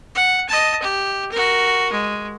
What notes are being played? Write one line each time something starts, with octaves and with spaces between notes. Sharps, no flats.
F#5
D#5 A5
G4
F#4 A#4
G#3